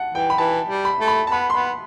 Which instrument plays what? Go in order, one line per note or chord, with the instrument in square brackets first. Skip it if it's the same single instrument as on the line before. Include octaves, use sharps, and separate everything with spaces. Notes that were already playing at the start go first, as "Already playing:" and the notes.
Already playing: [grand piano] F#5 A5
[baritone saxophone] E3 [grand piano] G5
[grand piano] B5
[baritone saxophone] E3 [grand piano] A5
[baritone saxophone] G3
[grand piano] B5
[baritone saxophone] A3
[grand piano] B5
A5
[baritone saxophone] B3 [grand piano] B5
[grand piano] C6
[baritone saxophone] B3 [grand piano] B5